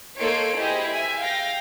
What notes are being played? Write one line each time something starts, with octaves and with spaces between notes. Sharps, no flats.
A#3 D#4 A4 C#5 C6 D7
E4 G4 G#4 C5 D#5
E5 G#5
F5 G5 A#6